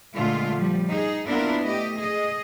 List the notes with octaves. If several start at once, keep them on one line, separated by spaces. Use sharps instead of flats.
A#2 D3 G#3 A3 F4
F3 G3
D#4 G#4
A#3 B3 D4 E4 F4 A#4
A3 G4 D#5
G#4 D#5